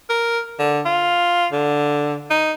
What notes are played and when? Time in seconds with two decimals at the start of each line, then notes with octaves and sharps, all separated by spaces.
0.10 A#4
0.59 D3
0.86 F4
1.53 D3
2.31 D#4